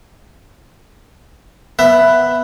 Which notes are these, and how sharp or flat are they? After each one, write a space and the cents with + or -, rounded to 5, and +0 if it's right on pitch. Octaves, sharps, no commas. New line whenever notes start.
B3 +0 E5 +10